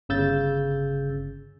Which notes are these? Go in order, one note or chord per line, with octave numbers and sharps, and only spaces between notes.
G1 C#3 E6 G6 A6